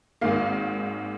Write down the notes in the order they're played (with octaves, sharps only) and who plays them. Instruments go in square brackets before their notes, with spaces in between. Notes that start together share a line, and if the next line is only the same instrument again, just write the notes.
[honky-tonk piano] G#1 G#2 D#3 A#3 F5